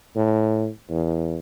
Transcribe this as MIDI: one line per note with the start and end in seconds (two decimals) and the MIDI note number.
0.16 0.68 45
0.90 1.38 40